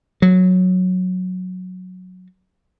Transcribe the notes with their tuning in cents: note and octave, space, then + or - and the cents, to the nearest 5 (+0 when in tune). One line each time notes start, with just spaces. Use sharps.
F#3 -10